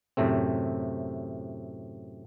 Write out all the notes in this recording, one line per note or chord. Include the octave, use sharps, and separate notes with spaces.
F#2 A2 C3 A3 C4